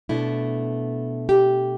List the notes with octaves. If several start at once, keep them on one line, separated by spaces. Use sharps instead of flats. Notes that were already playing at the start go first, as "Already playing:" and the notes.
B2 A3 D4 E4
G4